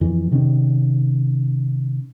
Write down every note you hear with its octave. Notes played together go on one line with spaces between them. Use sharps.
F2 E3
C3 D#3 C#4